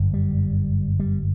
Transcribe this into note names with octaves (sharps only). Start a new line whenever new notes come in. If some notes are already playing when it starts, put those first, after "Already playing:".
Already playing: G1 F#2
G3
G3